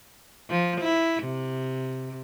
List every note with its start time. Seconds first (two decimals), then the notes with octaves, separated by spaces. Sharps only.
0.50 F3
0.81 E4
1.24 C3